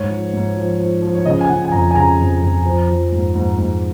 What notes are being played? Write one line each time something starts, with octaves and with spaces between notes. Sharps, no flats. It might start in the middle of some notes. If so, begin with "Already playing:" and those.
Already playing: G#2 C#5
F3
G#2
F3
F3
F3
C#5
C#3 D#5
G#5
C#3 F#5
G#5
F2 A#5
G#5
C#3 A#5
F2
F2
F3
F3
G#2
G#2
G#2